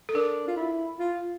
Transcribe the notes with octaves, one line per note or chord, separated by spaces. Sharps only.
A4
D4 A#4
F4
E4
F4